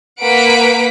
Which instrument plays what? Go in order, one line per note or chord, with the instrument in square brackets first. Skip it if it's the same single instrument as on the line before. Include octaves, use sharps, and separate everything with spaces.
[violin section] A#3 B4 F#5 B6 D7